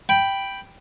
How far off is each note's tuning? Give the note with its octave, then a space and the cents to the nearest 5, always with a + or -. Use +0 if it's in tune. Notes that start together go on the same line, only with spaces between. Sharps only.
G5 +0 B5 +0